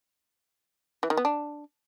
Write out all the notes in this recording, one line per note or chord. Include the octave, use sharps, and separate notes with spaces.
E3
D#3
B3
D4